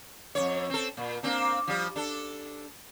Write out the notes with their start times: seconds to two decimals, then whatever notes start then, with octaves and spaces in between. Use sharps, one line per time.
0.35 F2 G#2 C#5
0.70 C4 A4
0.97 A#2
1.23 A#3 C4 D4
1.68 F3 G3
1.96 D4 A4